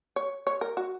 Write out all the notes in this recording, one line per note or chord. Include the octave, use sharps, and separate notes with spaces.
C#5
C#5
A#4
F#4